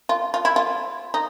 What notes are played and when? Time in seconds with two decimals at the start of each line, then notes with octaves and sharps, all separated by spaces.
0.09 F4
0.34 F4
0.45 E4
0.56 F4
1.14 D#4